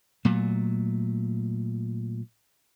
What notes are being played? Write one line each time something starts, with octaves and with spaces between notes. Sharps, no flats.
A#2 F#3 A3